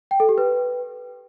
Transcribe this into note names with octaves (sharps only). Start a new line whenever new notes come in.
G5
A4
G4
B4